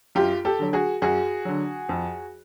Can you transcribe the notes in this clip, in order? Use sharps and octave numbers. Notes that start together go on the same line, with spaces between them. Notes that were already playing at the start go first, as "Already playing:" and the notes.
F#2 F4 G4
G4 A4
D3 F#3
F#4 G#4
F#2 F#4 G#4
D3 F#3
F2